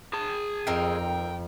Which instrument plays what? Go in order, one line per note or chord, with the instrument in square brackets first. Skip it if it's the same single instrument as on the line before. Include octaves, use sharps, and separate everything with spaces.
[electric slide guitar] G#4 A5
[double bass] F2 [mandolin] C4 D#4 A#4 [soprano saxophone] G5